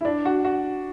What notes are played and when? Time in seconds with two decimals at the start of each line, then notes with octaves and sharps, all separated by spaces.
0.01 E4
0.05 D4
0.25 F#4
0.44 F#4